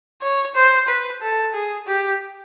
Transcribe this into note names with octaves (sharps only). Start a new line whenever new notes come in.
C#5
C5
B4
A4
G#4
G4